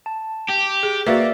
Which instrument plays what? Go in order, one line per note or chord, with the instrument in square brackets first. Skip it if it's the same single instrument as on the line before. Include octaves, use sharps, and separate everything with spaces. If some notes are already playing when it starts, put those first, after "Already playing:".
[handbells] A5
[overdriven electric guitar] G4
[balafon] G#4
[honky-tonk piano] A#3 F#4 [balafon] B4 [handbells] D5 E5